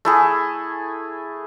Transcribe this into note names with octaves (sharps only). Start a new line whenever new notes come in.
A3 E4 G#4